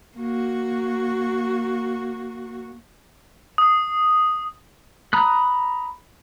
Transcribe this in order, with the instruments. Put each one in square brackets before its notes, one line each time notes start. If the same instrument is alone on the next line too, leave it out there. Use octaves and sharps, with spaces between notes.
[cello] A#3 F#4
[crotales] D#6
[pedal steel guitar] A#5 B5 D#6 F#6